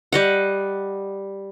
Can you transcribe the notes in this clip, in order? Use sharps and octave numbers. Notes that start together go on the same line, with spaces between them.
G3 D#5 F#5